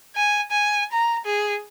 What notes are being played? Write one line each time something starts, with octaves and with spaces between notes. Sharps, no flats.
G#5
G#5
A#5
G#4